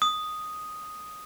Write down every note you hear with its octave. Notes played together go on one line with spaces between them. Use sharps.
D#6